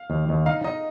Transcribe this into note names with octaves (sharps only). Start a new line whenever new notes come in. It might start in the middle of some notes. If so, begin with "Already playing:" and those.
Already playing: F5
D#2
D#2
D#4 F5
D#4 D#5